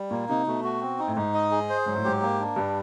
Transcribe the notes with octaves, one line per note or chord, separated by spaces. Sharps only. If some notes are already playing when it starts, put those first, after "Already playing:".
Already playing: G3
A#2 A#3
C3 D#4
B2 A3
F#4
C4
D#4
A2
G#2 D#4
D#5
G#4
C5
G#2 F#3
A2
G#2 G4
A#3
D4
G2 G3